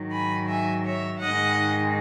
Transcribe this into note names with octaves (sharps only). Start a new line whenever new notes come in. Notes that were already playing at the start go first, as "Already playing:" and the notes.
Already playing: G#2 D#3 F#3
G#5 B5
E5 G#5
C#5 E5
G#2 D#3 G#3 D#5 F#5